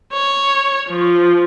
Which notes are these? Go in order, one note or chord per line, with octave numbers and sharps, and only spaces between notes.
C#5
F3